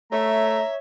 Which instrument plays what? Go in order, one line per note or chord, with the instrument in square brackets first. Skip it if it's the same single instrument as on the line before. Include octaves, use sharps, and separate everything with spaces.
[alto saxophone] A3 [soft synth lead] C#5 [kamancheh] E5 [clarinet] A#5